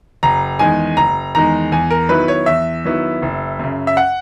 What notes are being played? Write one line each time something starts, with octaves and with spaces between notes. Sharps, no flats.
F#1 A#5
E2 D#3 G#3 G#5
F#1 A#5
E2 D#3 G#3 A#5
E2 G#5
A#4
D#3 F#3 B3 E4 B4
C#5
E2 E5
D#3 F#3 B3 E4
F#1
F#2 C#3
E5
F#5